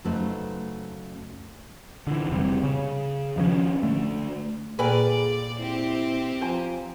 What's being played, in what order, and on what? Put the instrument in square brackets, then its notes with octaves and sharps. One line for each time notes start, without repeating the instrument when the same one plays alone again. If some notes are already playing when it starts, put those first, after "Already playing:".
[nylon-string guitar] F#2 C#3 A3 D#4 B4 C5
[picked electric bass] D3 E3
F1 C3 G3
C#3
D#3 F3 G#3 C#4
D3 A3
[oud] A#2 B4 [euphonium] G#4 [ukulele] A4 G5 G#5 [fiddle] D5
[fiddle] C4 G4 [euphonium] E4
[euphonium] F3 [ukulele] C5 G#5 A#5